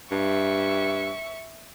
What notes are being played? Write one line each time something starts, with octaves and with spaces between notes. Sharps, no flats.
G2 E5 C#6